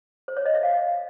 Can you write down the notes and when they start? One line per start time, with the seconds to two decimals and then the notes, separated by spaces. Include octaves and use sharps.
0.28 C5
0.37 C#5
0.46 D#5
0.54 E5
0.63 F5